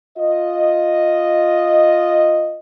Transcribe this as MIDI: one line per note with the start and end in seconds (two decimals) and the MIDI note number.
0.18 2.59 65
0.18 2.59 75